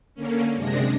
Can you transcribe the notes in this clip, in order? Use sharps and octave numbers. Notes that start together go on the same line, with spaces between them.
D3 A#3 C#4
F#2 C3 G#3 D4 A#6